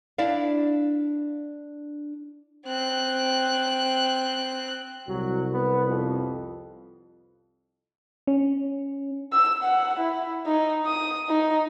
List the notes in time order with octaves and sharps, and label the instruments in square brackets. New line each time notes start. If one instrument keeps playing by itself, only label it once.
[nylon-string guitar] D4 E4 D5 F5
[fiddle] C4 F#6
[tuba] C2 [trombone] F#3
[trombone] B3
F2
[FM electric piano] C#4
[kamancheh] E6
F#5
E4
D#4
D#6
D#4